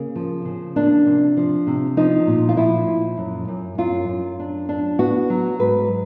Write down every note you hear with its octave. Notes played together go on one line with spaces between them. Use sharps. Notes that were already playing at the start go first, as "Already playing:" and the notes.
Already playing: C#3 A#3
F3
C#3
A#3 D4
C3
F3
C3
F3 D#4
A#2
F4
F3 E4
A#2
F#2
F#2
F#2 F4
F#2
D4
D4
B3 F#4
F#3
G#2 B4